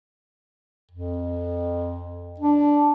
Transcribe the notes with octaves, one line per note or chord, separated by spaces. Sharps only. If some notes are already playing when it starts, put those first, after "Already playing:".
F2
D4